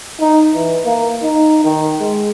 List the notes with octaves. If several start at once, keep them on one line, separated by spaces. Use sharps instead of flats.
D#4
E3
A#3
D#4
D#3
G#3